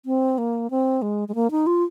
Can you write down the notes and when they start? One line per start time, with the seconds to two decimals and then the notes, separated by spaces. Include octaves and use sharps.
0.06 C4
0.38 A#3
0.71 C4
1.02 G#3
1.28 G#3
1.35 A#3
1.51 D#4
1.67 F4